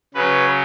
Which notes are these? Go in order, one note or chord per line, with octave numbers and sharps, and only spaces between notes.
C#3 F#3 B4